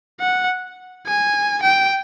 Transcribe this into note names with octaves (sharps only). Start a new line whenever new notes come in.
F#5
G#5
G5